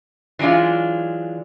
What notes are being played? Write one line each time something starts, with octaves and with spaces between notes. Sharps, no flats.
E3 F#3 G#3 D4 F4